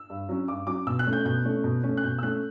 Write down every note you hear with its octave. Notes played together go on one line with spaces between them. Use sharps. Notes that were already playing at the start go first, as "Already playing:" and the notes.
Already playing: E6
G2
F#3 C#4
G2 D6
F#3 C#4 D6
B2 E6
F#6
A3 C#4
G6
B2 G6
A3 C#4
B2
A3 C#4
F#6
B2 G6
E6
A3 C#4 F#6